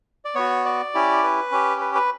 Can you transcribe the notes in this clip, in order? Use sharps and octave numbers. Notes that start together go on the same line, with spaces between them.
D5
B3 F#4 C#5
D5
C#4 E4 G4
B4
C#4 G4
B4
B4